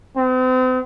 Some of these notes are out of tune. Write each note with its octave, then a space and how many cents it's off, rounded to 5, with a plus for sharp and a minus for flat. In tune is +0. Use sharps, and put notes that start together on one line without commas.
C4 -40